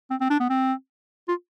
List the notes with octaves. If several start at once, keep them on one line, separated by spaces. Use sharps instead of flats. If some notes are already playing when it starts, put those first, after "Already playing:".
C4
C4
D4
B3
C4
F4